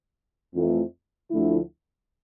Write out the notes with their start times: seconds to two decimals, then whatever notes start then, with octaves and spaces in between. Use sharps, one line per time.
0.55 F2 E3 A3
1.31 D2 D3 F3 A3 E4